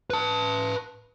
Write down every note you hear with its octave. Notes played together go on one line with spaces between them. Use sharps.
B4 A5